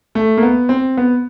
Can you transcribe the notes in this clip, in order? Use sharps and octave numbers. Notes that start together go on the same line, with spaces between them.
A3
A#3
B3
C4
B3